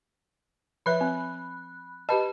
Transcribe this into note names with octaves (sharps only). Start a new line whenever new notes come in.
F3 B4 E5 B5 F#6
C4
G4 B4 D#5 A5 B5